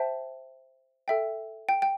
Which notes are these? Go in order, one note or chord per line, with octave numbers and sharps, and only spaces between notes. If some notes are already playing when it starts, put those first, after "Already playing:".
Already playing: C5 E5 G5 A5
A4 E5 G5
G5
G5